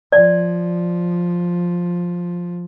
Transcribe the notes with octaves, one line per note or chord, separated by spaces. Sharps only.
F3 D5